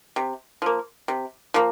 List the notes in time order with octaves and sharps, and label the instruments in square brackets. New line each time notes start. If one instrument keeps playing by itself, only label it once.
[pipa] C3
F3 A#3
C3
F3 A#3